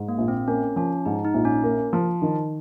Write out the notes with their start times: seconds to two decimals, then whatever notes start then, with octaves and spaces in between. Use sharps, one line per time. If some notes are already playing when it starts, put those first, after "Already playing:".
Already playing: G#2
0.09 A#3
0.18 A#1
0.28 C4
0.48 A#3 C#4
0.76 F3 C#4
1.05 G#2 D#4
1.25 D#4
1.34 A#1
1.45 C#4
1.64 A#3
1.93 F3
2.22 D#3